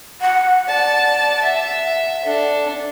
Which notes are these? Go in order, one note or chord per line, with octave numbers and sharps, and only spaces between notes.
F#5
D5 F#5 A5
E5
D4 A4